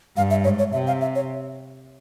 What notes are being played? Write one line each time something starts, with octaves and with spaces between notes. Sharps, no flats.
G2 F5
E5
G#2 C#5
C#5
C3 E5
F5
E5
C#5